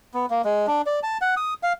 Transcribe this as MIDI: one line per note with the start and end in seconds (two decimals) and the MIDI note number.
0.14 0.26 59
0.30 0.42 58
0.45 0.66 56
0.67 0.82 62
0.86 1.00 74
1.03 1.18 81
1.21 1.35 78
1.37 1.54 87
1.63 1.73 77